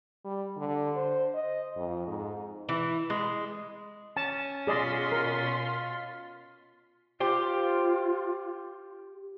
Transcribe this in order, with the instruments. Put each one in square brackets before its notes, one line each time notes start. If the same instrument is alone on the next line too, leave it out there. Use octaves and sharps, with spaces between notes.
[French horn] G3
D3
C5
D#5
F2
G#2
[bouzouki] E3
G#3
[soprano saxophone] C#4 [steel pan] A5
[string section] B2 C6 B6 [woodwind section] F4 [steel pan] G#4 D5 D#5
[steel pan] A#4
[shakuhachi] F4 [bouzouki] G4 C5